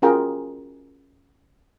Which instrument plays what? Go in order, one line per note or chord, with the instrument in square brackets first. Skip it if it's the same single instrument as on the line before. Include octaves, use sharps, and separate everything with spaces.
[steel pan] C#4 F4 F#4 G#4 A#4 G5